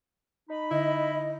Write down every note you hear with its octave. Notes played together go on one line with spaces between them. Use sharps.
D#4 B5
D3 E4 D#5